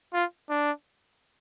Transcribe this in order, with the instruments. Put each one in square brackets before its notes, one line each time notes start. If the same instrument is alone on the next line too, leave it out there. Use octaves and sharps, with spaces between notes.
[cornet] F4
D4